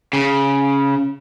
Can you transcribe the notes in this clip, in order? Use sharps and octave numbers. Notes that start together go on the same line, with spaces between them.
C#3